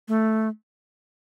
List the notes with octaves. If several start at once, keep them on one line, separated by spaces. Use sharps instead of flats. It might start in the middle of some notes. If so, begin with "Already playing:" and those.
A3